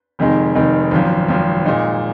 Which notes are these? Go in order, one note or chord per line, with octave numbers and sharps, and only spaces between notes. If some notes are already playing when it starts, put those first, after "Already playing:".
F1 F2 D#3 G#3 D#4
F1 F2 D#3 G#3 D#4
G#1 F#2 F3
G#1 F#2 F3
A#2 G#3 D#4